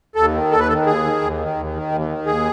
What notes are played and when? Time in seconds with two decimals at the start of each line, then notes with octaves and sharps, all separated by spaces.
0.15 D#2 A4
0.33 D#3
0.51 D#2 A4
0.59 B4
0.68 D#3 A4
0.86 D#2 G#4
1.04 D#3
1.21 D#2
1.39 D#3
1.56 D#2
1.74 D#3
1.92 D#2
2.09 D#3
2.26 D#2 G#4